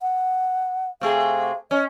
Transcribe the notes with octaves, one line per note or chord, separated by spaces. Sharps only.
F#5
C3 A3 G#4 F5
C#4 D#5